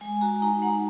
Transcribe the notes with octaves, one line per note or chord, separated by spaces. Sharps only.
G#3 G#5
F#4 A#5
D#4 A#5
G#3 F#5